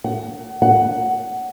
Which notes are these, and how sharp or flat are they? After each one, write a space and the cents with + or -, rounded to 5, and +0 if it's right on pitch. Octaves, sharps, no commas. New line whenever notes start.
F#5 +35
F#5 +15